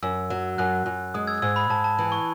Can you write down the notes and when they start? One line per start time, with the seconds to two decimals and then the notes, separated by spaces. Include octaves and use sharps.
0.02 F#2 E6
0.30 F#3
0.58 F#2 F#6
0.86 F#2
1.14 G#3 D#6
1.27 E6 G#6
1.42 G#2 E6 G#6
1.56 B5
1.69 G#2 A5
1.84 A5
1.98 E3
2.12 C#6